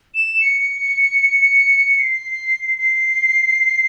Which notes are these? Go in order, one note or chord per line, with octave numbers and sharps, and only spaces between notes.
E7
C#7
C7
C7